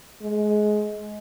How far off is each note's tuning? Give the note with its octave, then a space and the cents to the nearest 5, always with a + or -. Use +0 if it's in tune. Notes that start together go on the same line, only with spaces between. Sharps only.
G#3 +20